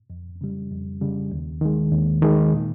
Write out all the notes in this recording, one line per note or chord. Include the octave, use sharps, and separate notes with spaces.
F2
C#3 G3
F2
C#3 G3
D#2
D#3 G#3
D#2
D#3 G#3
A#2